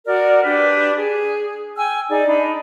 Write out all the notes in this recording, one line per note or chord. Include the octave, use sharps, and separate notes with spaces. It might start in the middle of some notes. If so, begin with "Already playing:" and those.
F#4 A#4 D5
D4 G4 B4
G#4
G5 G#5 E6 F6
D#4 G#4 D5
D4 D#4 B5